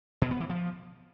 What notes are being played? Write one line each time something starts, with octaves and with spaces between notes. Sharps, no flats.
B2
B3
E3
F3